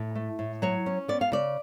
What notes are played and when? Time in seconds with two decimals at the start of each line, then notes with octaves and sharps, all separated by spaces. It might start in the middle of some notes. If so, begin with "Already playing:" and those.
Already playing: A2
0.15 A3
0.39 A2
0.62 F#3 C#5
0.86 C#4
1.08 B3 D5
1.21 F5
1.32 C#3 D5